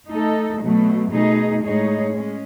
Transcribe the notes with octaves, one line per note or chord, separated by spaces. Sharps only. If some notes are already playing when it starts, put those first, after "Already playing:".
A3 D#4 A4
B2 F#3 A3
B2 A3 D#4 G#4
A2 G#3 D#4 G#4 C#5
G#3 C#4